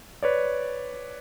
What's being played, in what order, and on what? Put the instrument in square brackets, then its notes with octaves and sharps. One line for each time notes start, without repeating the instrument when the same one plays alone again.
[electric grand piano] B4 C#5 D5